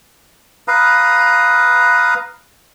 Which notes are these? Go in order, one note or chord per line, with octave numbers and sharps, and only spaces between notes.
B4 F5 A#5 D#6